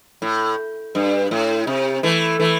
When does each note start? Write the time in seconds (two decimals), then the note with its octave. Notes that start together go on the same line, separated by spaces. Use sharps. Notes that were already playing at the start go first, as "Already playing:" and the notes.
0.22 A2
0.95 G2
1.31 A2
1.67 C3
2.03 E3 A3
2.40 E3 A3